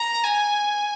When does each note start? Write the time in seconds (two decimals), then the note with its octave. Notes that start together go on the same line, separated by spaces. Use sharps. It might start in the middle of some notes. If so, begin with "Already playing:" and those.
Already playing: A#5
0.23 G#5